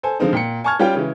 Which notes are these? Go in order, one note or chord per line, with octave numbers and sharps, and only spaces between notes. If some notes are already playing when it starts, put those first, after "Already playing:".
A4 C5 G#5
D3 F3 G#3 C4 D#4
A#2 G5 C#7
G#5 A5 C#6 F6 G#6
G3 C#4 F4 G4 C#5 G5
C#3 E3 G#3